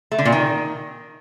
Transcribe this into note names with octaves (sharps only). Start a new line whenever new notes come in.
A3
D3
A#2
D#3